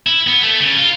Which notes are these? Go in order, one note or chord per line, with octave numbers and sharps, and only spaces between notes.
E4
B3
A3
C#3
F4